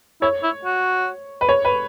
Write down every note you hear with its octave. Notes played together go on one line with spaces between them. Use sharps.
E4 C#5
E4
F#4
B4
C#5
B4